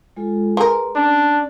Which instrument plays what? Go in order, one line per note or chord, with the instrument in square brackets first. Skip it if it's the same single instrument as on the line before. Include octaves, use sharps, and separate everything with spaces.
[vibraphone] G#3 F4 A4
[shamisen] G#3 A#4 [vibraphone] B4
[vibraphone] C#4 [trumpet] D4